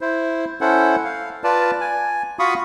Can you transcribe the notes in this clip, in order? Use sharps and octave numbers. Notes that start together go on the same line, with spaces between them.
E4 C5
C#4 E4 A4 C5 F#5
F5
F4 B4 D5 A5
G#5
F4 F#4 F5 B5 C#6 D#6